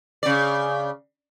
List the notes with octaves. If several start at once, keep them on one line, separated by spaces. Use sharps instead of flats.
C#3 D5